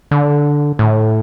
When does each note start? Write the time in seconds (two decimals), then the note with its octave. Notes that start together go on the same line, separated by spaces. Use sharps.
0.11 D3
0.79 A2